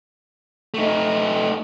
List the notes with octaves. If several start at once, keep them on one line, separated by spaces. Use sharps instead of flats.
A3 D#4